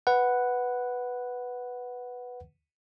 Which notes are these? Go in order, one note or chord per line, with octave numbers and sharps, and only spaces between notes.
B4 F#5